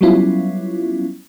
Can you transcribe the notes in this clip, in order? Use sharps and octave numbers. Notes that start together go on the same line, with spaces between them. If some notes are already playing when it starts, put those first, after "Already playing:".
F#3 G3 B3 C#4 E4 F4